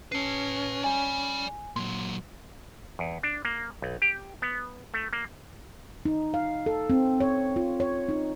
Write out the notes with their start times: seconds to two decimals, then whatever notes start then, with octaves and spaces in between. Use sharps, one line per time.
0.12 C#4 B4 A5 C7
0.84 D5 G#5 B5
1.76 A#2 F#3 C6
2.99 E2
3.23 D4
3.45 A#3
3.82 B1
4.02 G4
4.42 B3
4.94 A3
5.13 A#3
6.05 D#4
6.34 F5
6.66 A4
6.90 C4
7.20 C#5
7.56 F4
7.80 C#5
8.09 D#4